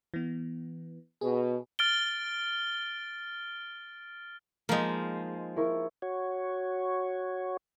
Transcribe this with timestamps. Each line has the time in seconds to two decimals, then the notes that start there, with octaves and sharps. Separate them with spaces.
0.14 E3 B3
1.21 B2 G#4
1.79 F6 A6 D7 G7
4.69 F3 G#3 A#3 D#4
5.56 E4 A#4 C#6
6.02 F#4 C#5